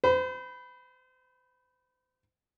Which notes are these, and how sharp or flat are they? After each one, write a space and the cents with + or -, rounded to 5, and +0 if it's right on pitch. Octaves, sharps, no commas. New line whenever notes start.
C5 -35 B5 +0